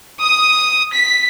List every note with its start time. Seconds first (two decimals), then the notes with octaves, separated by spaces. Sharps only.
0.21 D#6
0.94 B6